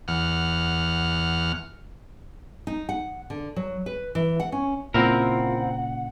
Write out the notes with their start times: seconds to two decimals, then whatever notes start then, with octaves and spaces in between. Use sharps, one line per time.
0.08 E2 F#5 F6
2.67 D#4
2.89 F#5
3.30 D3
3.56 F#3
3.86 B4
4.15 E3
4.40 F#5
4.52 C#4
4.94 A#2 C#3 C4 E4 F4 A#4 F#5